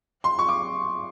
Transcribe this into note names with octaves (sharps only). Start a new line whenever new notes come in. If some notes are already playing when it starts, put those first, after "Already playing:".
C6
C#6
D6